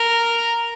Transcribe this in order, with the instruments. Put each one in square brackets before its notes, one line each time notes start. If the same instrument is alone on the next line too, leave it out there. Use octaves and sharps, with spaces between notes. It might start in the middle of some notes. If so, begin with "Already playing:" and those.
Already playing: [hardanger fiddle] A#4